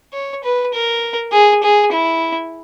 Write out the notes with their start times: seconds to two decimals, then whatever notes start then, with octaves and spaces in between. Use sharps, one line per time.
0.13 C#5
0.44 B4
0.74 A#4
1.32 G#4
1.63 G#4
1.92 E4